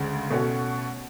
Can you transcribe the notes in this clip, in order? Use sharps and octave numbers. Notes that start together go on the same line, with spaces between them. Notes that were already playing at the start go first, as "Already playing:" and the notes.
Already playing: D2 C#3 G#3
B2 A3 C#4 F#4